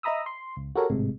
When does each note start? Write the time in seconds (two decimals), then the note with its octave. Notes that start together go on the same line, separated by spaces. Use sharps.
0.03 D#5 E5 A#5 B5 D#6 E6
0.26 C6
0.56 C#2
0.75 F#4 G4 A4 A#4 C#5
0.90 G#1 A2 C3 G#3